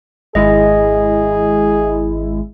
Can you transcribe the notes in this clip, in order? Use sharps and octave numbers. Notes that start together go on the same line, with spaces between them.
G#1 G#3 E4 G#4 D#5